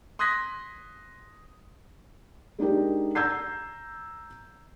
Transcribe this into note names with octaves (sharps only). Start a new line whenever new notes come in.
C6 D#6 F#6 G#6 A#6 B6
G#3 D4 D#4 G4 A#4
A#5 E6 G6 G#6 C7